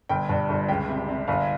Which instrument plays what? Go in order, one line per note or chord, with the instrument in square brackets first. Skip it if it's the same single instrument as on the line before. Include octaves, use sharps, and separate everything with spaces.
[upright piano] G1 G5
G2
G1
C#2 G5
C3
C3
G1 F5